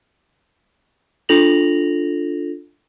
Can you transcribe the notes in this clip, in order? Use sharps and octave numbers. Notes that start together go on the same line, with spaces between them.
D4 F4 A4 A#6 F7 F#7